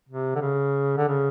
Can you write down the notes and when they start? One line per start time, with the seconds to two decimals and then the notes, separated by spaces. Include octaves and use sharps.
0.09 C3
0.36 D3
0.41 C#3
0.97 D3
1.08 C#3